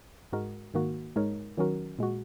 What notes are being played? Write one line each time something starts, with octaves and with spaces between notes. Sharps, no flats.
G#2 G#3 F#4 A#4
G#2 D#3 A#3 F#4
G#2 G#3 D#4 A#4 C#5
D#3 F#3 C#4 F#4 A#4
A#2 G#3 F#4